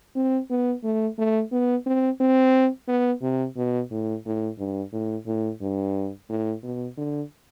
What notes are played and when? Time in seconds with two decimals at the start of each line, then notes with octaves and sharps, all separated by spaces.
0.15 C4
0.50 B3
0.84 A3
1.18 A3
1.52 B3
1.86 C4
2.20 C4
2.88 B3
3.22 C3
3.57 B2
3.91 A2
4.25 A2
4.58 G2
4.93 A2
5.26 A2
5.62 G2
6.29 A2
6.63 B2
6.97 D3